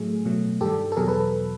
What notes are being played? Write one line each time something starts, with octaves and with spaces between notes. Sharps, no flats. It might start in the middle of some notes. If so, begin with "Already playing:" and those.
Already playing: A2 F#3 A3 G#4
B2 F#3 A3
G2 D#3 G3 G4 A4
A4
E2 B2 F#3 G#4 A#4
A4 B4